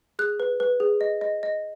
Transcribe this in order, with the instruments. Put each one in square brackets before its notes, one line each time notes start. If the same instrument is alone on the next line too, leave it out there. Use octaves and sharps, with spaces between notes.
[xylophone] G#4 F#6
B4
B4
G#4
D#5
D#5
D#5